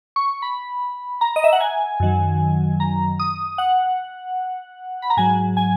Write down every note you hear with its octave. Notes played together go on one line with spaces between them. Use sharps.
C#6
B5
A#5
D#5
E5
F#5
G#5
F#2 D#3 F#3
A#5
D#6
F#5
B5
A#5
G#2 F#3 G#5
G#5